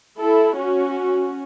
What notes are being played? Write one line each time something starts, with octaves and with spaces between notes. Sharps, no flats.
E4 A4
C#4 F#4